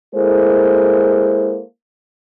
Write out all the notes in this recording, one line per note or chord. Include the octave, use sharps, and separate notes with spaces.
G#3 A#3 E4 G#4 A4 C5